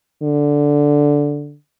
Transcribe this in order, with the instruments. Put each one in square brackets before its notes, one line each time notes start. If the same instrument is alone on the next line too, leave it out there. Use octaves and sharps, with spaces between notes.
[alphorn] D3